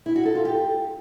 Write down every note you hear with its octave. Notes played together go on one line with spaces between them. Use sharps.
E4
F#4
A4
F4
G4